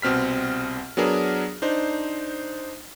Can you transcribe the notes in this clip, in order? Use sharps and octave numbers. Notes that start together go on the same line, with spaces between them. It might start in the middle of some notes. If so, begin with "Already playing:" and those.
C2 B2 C4 F6 B6
F#3 B3 D4 G#4 A#4
D4 D#4 C5